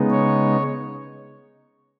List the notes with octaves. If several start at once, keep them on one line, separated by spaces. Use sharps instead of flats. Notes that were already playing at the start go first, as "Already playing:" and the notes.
Already playing: C#3 G#3 B3 D#4
C#5